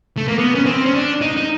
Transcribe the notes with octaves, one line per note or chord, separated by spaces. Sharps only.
A3
A#3
B3
C#4
C4
C#4
D4
D#4
D#4